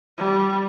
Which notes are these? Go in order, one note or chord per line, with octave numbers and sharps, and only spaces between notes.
G3